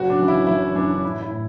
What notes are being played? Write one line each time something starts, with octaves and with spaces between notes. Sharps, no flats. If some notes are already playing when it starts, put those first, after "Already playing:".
Already playing: F#1 F#4
D4
F#2 E3
E4
F#1 E4
F#2 E3 D4
D4
A1 E4
E4
A2